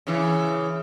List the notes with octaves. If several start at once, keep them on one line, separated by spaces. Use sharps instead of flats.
C#3 E3